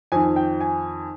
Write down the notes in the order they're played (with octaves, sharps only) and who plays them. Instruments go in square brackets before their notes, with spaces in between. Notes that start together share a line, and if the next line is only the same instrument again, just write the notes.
[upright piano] F2 D#3 G#5
G5
G#5